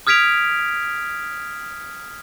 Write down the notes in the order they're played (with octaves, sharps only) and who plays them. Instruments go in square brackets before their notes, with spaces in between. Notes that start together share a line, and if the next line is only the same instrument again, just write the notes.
[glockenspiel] D#6 F6 G#6 B6 D7 F7